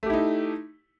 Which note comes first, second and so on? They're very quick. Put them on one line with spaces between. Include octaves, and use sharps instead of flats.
A3 G4 E4 D#4